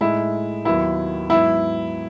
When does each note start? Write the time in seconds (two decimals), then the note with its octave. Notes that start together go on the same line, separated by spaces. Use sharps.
0.01 A2 G#3 D#4 E4
0.65 D#2 D#3 F#3 B3 E4
1.30 G#2 F#3 B3 E4